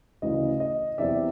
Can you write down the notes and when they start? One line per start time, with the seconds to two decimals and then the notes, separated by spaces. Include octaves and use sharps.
0.22 D2 C#3 E3 D#5
0.60 D#5
0.98 E2 C3 E3 D5 E5